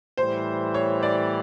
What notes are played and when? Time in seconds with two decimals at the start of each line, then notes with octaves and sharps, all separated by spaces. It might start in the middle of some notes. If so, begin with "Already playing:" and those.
0.17 A2 E3 G3 C5
0.74 C#5
1.03 D5